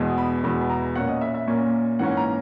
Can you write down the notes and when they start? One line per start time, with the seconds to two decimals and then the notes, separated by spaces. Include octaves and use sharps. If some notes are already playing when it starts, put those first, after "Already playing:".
Already playing: E2 B2 G#3 B3
0.18 B5
0.44 E2 B2 G#3 B3 B5
0.61 B5
0.70 A#5
0.96 A#2 A#3 C#4 F#5
1.09 D#5
1.21 E5
1.35 E5
1.47 A#2 A#3 C#4
1.99 G#2 E3 A#3 C#4 F#5
2.17 A#5